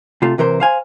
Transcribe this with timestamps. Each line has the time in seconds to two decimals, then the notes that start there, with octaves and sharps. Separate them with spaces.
0.22 C3 A3 F4
0.38 C3 E3 A#4 C5
0.60 C5 F5 G#5